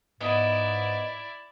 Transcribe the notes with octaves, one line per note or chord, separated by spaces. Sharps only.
G#2 B3 E4 D5 D#5